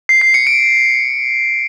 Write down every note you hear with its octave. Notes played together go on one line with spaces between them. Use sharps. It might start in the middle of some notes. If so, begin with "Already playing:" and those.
C7
C7
C#7
D7